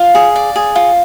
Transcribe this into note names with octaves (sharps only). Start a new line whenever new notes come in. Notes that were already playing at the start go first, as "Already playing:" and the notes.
Already playing: F4 F5
G#4
D5
G#4
F4